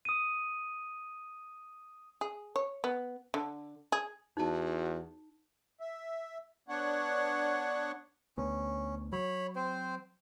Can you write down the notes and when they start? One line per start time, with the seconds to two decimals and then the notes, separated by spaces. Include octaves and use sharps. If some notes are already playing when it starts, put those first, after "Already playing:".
0.05 D#6 D#7
2.21 G#4
2.56 C#5
2.84 B3
3.34 D3
3.92 G#4
4.37 E2 D#4 F#4 A5
5.80 E5
6.69 B3 D4 C#5 F#5
8.38 D2 B3 C#4
9.13 F#3 C#5 B5
9.56 C4 C5